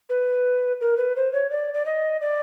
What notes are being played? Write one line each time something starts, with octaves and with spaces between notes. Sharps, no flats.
B4
A#4
B4
C5
C#5
D5
D5
D#5
D5